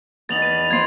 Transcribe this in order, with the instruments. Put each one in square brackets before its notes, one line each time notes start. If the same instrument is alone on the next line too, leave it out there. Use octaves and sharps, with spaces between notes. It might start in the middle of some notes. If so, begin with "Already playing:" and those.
[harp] E2 D#4 [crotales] A6 F7 F#7
[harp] B4 [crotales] D#7
[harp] F3 B3 C4 [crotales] G#6 C7